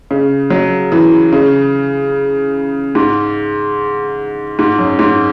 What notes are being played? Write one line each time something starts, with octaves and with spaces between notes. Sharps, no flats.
C#3
F#3
E3
C#3
G#2
G#2
F#2
G#2